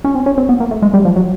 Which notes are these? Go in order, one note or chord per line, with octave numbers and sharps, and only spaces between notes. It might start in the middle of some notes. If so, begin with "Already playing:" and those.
C#4
C4
C#4
C4
B3
A#3
A3
G#3
G3
F3
F#3